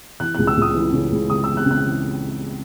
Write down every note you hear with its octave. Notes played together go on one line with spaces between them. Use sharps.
E3 F#6
C#2 F#6
E6
C#2 D#6
E3
C#3
C#2
C#2 D#6
E3 E6
F#6
C#3
F#6
E3